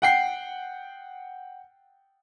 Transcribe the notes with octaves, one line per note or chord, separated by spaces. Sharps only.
F#5 G5 C7